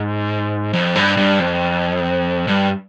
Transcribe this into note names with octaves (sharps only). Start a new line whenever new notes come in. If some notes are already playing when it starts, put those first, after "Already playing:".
Already playing: G#2
F2
G2
G2
F2
G2